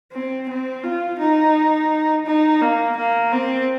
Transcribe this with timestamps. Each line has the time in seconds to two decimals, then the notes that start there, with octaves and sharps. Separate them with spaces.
0.12 C4
0.49 C4
0.83 F4
1.19 D#4
2.26 D#4
2.61 A#3
2.97 A#3
3.32 C4